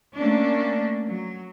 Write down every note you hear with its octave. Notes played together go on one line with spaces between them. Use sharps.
A3 A#3 C#4 D4
F#3